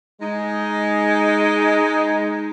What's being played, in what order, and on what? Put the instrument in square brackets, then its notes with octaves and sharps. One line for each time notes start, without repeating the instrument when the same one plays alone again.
[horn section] G#3 D#4